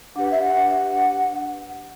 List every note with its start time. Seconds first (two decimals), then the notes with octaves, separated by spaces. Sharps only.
0.16 D4 G4 B4 F#5
0.32 E5
0.43 F#5